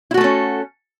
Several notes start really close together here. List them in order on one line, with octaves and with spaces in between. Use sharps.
E4 F#4 A3 A4 C#4